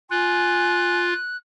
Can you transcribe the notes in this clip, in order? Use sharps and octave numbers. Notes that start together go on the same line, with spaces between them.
F4 G#5 F#6